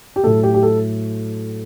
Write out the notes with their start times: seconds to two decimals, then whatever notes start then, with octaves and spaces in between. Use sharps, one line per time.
0.16 G4
0.23 A2 F#3 A3 A4
0.43 G4
0.54 G4
0.63 A4